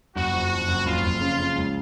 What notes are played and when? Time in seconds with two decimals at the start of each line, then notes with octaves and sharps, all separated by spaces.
0.15 F#1 F#4
0.32 F2
0.50 F2
0.68 F#1
0.85 F#1 F4
1.03 F#1
1.21 C#3
1.39 C#3
1.56 C#2